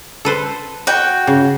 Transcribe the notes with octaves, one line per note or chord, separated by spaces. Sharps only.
A4 B4 C5
F#4 G5
C#3